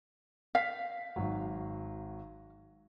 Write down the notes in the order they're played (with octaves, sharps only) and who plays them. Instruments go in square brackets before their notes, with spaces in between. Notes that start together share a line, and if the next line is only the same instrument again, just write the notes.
[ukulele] F5 [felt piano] B6
[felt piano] G#1 F#3